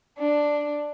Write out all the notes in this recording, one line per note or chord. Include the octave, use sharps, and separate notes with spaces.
D4